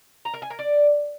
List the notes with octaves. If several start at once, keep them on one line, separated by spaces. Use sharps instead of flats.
A#5
A#4
G#5
A#4
D5